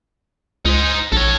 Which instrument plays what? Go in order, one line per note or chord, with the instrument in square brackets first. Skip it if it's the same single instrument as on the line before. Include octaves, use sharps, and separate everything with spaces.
[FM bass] C#2 [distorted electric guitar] D#4 C5
[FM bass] A#1 [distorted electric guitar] A4 C#5